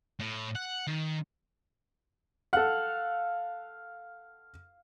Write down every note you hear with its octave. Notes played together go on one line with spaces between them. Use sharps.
A2
F#5
D#3
A4 F5 F#5